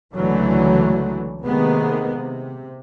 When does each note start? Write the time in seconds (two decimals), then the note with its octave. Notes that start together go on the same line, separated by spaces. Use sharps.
0.15 C#2 D3 E3 F#3 A3
1.45 C3 D#3 G#3 A#3 B3
2.16 C3